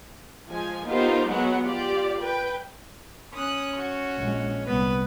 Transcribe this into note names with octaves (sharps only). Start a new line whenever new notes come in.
F3 G#3 G#5
B3 D#4 F4 G4 A#4 C5
F#3 G#3 B3 F#4 F#5
F4 G4 D5
B4 G5
C#4 D#6 F#6
F#4
A#1 G#3
C2 B3 B4